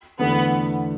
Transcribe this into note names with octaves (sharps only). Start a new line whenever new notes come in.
E2 D3 A3 B3